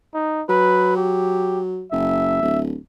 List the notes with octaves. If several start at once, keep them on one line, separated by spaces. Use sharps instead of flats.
D#4
F#3 B4
G4
F#1 E5
D1